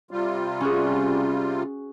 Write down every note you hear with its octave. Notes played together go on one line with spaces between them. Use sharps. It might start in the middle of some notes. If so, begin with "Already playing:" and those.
C3 G3 F4
C#4 F#4 G#4